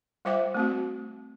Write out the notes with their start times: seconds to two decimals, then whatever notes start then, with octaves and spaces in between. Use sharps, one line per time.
0.25 G3 F4 C5 E5 G5 D6
0.55 A3 C4 F#4